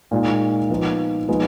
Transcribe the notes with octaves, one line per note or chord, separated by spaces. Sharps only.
A#2 G#3 D#4
F3 B3 D#4
F3 G#3 B3 D#4